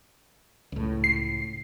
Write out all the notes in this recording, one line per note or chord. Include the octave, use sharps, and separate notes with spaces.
C#2 A2
C7